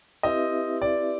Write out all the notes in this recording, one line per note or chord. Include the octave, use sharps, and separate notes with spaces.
C4 E4 G4 B4 D#5 E5
D5